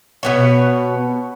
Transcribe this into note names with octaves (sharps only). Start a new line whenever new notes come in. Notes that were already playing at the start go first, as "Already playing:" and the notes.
B2 B3 C#5